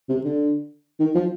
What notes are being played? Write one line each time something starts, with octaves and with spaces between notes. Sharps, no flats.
C3
D3
D#3
F3